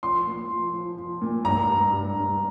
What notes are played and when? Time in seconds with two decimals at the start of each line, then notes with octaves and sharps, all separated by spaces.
0.03 F3 C6
0.27 A#2
0.50 F3
0.74 F3
0.97 F3
1.22 A#2
1.45 G2 A#5
1.69 G2
1.92 G2
2.16 G2